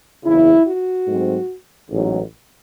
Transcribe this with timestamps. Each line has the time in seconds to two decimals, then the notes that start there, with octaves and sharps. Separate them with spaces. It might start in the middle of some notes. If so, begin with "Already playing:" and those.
0.24 F#1 E2 C#3 E4
0.66 F#4
1.07 G#2 F#3 A3 C4
1.90 A1 G#2 F#3